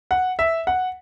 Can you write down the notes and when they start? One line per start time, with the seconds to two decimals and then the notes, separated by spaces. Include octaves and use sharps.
0.11 F#5
0.39 E5
0.67 F#5